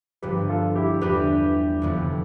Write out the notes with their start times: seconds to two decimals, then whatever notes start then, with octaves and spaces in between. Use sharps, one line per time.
0.22 G1 G2 F3 G4 B4
0.49 F4 A4
0.76 E4 G4
1.01 E2 D3 G3 D4 F4 G4 B4
1.82 F1 F2 D3 F3 B3